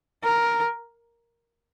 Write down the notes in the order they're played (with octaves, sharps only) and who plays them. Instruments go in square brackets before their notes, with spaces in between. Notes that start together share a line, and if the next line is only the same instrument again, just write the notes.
[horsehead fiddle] A#4